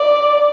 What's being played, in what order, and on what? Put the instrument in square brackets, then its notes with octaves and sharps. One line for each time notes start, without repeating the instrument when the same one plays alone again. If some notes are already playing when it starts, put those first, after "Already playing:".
Already playing: [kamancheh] D5